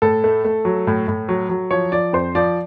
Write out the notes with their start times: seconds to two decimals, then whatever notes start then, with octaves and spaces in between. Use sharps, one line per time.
0.02 A2 A4
0.24 A3
0.44 A3
0.65 F#3
0.87 A2
1.08 A2
1.29 F#3
1.49 F#3
1.71 F3 C#5
1.92 F3 D5
2.13 F2 C5
2.35 F3 D5